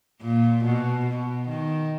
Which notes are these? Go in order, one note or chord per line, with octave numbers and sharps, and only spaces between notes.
A#2
B2
B2
D#3